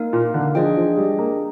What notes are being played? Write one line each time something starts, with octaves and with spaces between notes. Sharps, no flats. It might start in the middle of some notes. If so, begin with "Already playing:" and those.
Already playing: A#3 D#4 A#4 F5
A#2
D3
F3 D4 G#4 D#5 G5
F3
G3
A#3